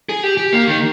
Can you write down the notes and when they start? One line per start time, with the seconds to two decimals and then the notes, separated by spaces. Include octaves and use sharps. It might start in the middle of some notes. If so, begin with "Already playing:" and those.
0.09 G#4
0.23 G4
0.37 G4
0.53 A#3
0.67 D#3